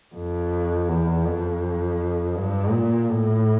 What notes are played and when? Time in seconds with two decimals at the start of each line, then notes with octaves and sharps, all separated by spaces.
0.15 F2
0.89 E2
1.25 F2
2.36 G2
2.72 A#2
3.09 A2